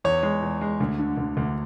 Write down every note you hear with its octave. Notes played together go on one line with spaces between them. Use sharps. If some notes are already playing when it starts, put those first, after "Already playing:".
E2 C#5
G#3
E2
G#3
D2
D3
D2
D2